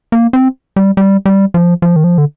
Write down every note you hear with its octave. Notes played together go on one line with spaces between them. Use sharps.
A#3
C4
G3
G3
G3
F3
F3
D#3
F3
D3